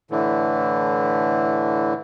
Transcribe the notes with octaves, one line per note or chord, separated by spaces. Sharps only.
A2 D3 E3